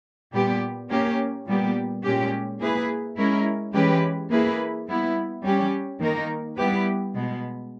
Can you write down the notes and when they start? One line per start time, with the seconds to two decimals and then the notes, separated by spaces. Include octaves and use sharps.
0.33 A#2 G3 B3 G4
0.89 A#3 C#4 G4
1.46 A#2 G3 B3 G4
2.03 A#2 G#3 C#4 G4
2.59 A#3 E4 G#4 B4
3.17 G#3 C#4 E4 A#4
3.73 E3 G#3 C#4 G4 B4
4.30 A#3 E4 G#4 B4
4.87 G3 B3 E4
5.43 G3 C#4 G4
6.00 D#3 A#3 D#4 A#4
6.57 G3 B3 E4 G4 B4
7.14 B2 G#3 B3